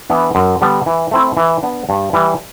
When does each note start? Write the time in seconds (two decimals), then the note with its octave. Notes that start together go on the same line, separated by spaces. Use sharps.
0.10 E3 B3 D4
0.35 F#2
0.61 D3 G3 B3 D4
0.86 E3
1.11 A3 C4 E4
1.37 E3
1.63 B3 D4
1.89 G2
2.13 E3 G3